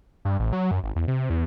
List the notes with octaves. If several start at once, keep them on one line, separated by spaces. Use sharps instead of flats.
G2
A1
F#3
F#2
G#1
E2
C3
E2